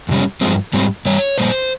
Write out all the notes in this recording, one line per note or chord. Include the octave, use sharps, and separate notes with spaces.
F2 C3 G3 C#4
G2 F3 G#3 C4
G#2 G3 C4
G2 G3 C#5
A#2 G3 A#3 C5